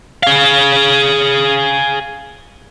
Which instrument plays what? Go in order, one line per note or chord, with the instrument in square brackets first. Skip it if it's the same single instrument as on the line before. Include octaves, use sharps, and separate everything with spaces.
[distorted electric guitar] G#4 F5